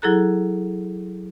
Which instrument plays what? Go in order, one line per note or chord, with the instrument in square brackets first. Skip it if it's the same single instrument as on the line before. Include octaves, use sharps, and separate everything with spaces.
[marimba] F#3 E4 G#4 A4 A#5 F#6